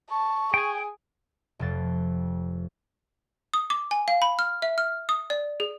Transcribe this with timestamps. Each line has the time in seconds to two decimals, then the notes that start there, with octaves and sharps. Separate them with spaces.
0.11 A5 C#6
0.54 G#4 G5 G#5
1.59 F1 F2 A6
3.54 D#6
3.70 D6
3.91 G#5
4.08 F5
4.22 B5
4.39 F6
4.62 E5
4.78 F6
5.09 D#6
5.30 D5
5.60 G#4